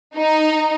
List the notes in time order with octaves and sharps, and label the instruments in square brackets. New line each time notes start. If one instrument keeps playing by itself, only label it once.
[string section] D#4